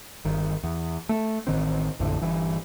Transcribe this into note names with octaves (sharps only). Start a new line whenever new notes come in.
G1 D#3
E2
A3
A1 D#3 C4
A1 F2 A2 D3
G1 G2 E3